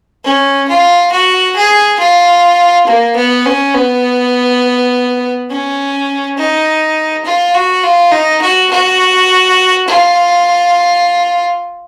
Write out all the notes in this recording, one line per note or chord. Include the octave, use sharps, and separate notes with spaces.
C#4
F4
F#4
G#4
F4
A#3
B3
C#4
B3
C#4
D#4
F4
F#4
F4
D#4
F#4
F#4
F4